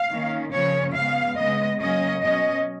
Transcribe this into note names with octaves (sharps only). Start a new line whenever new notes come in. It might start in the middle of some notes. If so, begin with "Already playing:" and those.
Already playing: F5
D#3 A#3 C#4
C#3 F3 A#3 C#4 C#5
C#3 G#3 B3 F5
C#3 G#3 B3 D#5
C#3 F#3 A#3 C#4 D#5
B2 F#3 C#4 D#5